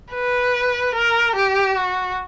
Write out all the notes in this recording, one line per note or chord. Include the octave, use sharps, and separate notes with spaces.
B4
A#4
G4
F#4